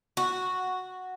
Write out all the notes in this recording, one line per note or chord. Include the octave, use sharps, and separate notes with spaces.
F#4